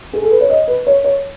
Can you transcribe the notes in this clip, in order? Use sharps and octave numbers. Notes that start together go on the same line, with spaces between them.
G#4
A4
B4
C#5
D#5
B4
C#5
C#5